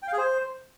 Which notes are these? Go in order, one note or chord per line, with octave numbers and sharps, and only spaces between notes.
G5
F5
G#4
C5